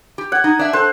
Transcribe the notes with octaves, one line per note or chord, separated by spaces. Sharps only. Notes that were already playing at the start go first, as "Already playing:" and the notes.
G4
F#5 G#6
D#4
D4 E5
A4 C5 A5 F#6